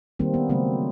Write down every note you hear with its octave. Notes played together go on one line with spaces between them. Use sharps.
D#3 G3 A#3 C4
B3
C#3 F#3 A3 C4